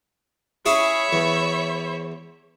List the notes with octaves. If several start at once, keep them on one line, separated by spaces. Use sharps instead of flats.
C#4 E4 G#4 C#5 E5 B5
E2